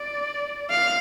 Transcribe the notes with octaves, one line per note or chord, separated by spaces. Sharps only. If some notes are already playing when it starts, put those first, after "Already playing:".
Already playing: D5
F5